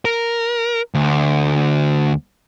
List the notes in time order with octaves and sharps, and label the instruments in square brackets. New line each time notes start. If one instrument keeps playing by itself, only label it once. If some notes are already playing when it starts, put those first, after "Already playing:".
[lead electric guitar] A#4
D2